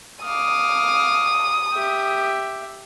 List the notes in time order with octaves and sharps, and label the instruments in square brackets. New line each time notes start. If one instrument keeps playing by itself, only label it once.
[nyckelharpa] F5 D6 [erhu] D#6
[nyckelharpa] G4 E5